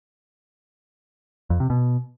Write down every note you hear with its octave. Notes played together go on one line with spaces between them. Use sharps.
F2
C3
B2